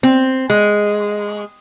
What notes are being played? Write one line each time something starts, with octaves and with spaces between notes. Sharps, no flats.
C4
G#3